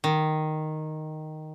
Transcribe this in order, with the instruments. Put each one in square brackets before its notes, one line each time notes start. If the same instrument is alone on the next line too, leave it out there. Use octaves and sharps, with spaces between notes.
[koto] D#3